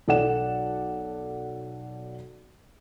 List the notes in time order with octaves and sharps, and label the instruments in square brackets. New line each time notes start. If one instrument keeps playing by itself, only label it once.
[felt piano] B1 A4 D5 F#5 E7